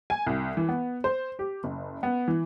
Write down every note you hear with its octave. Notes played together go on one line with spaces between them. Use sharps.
G#5
C2
E3
B3
C5
G4
F#1
B3
E3